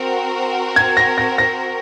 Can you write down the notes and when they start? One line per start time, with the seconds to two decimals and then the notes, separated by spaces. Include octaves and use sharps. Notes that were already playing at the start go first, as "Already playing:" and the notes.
Already playing: C4 F#4 A#4
0.76 G#6
0.97 A#6
1.18 A#6
1.38 A#6